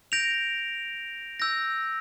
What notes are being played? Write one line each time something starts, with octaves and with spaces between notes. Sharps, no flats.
G6 A#6 D7 F7
E6 G6 A#6